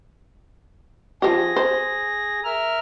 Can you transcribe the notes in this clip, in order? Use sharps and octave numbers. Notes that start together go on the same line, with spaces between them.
F3 G4 G#4 A#6
C5
A#4 E5 F6